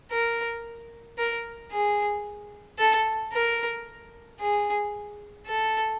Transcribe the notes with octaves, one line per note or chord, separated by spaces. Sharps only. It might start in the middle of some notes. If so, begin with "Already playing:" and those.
A#4
A#4
G#4
A4
A#4
G#4
A4